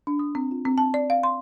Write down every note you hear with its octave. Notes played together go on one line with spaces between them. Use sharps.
D4
D#6
C4
F4
C4
A5
D5
F5
C6